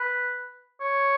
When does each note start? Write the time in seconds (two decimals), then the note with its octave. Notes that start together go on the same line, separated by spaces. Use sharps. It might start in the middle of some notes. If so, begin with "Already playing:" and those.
Already playing: B4
0.81 C#5